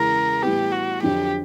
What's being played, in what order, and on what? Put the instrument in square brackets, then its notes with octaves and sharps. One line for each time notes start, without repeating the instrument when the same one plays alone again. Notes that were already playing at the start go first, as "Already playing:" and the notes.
Already playing: [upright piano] E2 C#3 E3 G#3 C#4 [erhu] A#4
[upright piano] A2 E3 G3 B3 [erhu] G4
[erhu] F#4
[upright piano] F2 D3 F#3 [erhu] G4